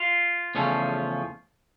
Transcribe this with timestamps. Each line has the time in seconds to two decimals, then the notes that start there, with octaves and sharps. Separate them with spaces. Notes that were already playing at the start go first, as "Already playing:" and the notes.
Already playing: F4
0.55 E2 C#3 F3 A3 C#4